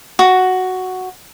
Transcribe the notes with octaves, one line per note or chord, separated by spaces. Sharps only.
F#4